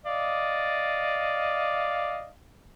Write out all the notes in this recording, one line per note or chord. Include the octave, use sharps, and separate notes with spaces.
D5 D#5 F5